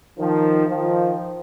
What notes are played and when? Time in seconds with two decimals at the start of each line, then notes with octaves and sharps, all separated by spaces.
0.19 D#3 F3
0.68 D#3 F3